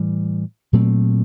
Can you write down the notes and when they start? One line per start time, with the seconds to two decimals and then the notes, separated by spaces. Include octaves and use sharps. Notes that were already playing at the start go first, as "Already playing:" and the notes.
Already playing: A2 E3 G3
0.73 A#2 F#3 A3 C4